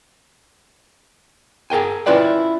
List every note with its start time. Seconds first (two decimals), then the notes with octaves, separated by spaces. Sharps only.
1.70 G#4 A#4 G5 G#5
2.06 C#4 E4 F4 B4 D5 G5